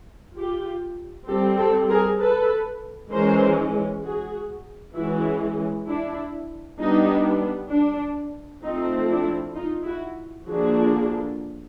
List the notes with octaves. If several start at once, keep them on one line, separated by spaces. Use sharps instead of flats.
F4 G4
G3 C4 G4 A4
G4 A4
G#4 A#4
A4 B4
E3 G#3 C#4 A#4 C5
F#4 G#4
E3 G#3 C#4 E4 F#4
D4 E4
G3 B3 D4 D#4
D4
F3 A3 C4 D#4
D4 E4
D#4 F4
E4 F#4
D3 F3 A#3 D4 F#4 G#4